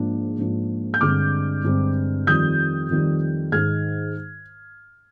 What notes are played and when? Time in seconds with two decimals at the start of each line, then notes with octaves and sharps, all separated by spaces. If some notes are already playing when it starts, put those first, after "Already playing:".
Already playing: G#2 F3 A#3 D4
0.38 G#2 F3 A#3 D4
0.94 G6
1.00 G2 D3 G#3 C4 D6 F6
1.64 G2 D3 G#3 C4
2.26 F2 D#3 G3 D#6 G6
2.89 F2 D#3 G3
3.52 G#2 D#3 G#3 D#4 F6 G#6